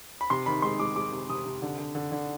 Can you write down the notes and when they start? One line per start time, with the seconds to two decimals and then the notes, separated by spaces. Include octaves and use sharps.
0.21 B5
0.30 C3 C6
0.46 D#3 B5
0.62 G#3 C6
0.79 G#3 D6
0.95 G#3 D6
1.12 C3
1.29 C3 D#6
1.46 C3
1.62 D3
1.79 D3
1.95 D3
2.12 D3